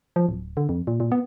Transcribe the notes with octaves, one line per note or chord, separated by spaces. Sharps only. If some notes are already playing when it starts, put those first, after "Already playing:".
F3
D1
D3
F2
A#2
A#2
B3